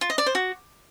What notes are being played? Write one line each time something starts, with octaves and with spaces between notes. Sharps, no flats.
F4
D#5
D5
C5
F#4